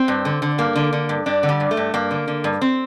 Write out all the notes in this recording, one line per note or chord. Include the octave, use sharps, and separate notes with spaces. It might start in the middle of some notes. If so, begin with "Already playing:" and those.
Already playing: C4
G2
D3
D3
G2 A#3
D3
D3
G2
G2 D4
D3
G3
G2
A3
G2
G2 A#3
D3
D3
G2
C4